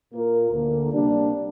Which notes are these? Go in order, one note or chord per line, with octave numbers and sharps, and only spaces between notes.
A#2 A#3 F4 A#4
D2 D3 A#3
C3 G3 A#3 D4